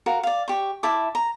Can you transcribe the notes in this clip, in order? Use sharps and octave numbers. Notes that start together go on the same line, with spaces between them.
F#4 A#4 F5
D5 F5
G4 C#6
E4 E5 A5 D6
A#5